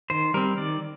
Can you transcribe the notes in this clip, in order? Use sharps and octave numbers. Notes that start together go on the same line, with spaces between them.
D#3 C5
G3 C4 A#4
D#3 D5